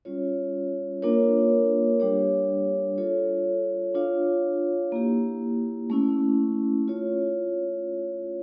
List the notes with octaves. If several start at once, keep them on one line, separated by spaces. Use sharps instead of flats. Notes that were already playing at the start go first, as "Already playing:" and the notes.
G3 C#4 F4 C#5
A#3 D4 F4 A#4 C#5
G3 D4 G4 C#5
F4 A4 C#5
D4 F4 C#5 F5
A#3 E4 G4
A3 C#4 E4
F4 C#5